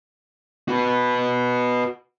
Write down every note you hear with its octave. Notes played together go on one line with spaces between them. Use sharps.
F#4 B4